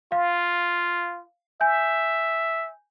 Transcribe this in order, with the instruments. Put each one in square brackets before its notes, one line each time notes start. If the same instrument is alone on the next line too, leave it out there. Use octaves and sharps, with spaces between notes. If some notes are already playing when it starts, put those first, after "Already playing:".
[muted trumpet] F4 [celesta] F5
[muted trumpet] E5 [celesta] G#5 G6